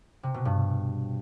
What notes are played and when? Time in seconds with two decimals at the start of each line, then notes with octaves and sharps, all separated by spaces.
0.23 C3
0.34 B2
0.45 G2